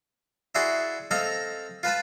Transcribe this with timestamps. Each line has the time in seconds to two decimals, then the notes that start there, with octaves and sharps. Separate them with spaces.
0.55 E4 F#4 G#4 D5 E5 C6
1.11 C4 A4 D#5 F5 A#5
1.83 F4 B4 A5 B5